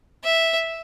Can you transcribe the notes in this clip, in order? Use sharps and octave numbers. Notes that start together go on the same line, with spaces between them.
E5